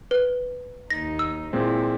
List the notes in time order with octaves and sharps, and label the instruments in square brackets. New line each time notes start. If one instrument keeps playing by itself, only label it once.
[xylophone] B4
[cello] D#2 D#4 [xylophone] A#6
[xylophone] E6
[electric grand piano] A#2 G#3 C4 [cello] E4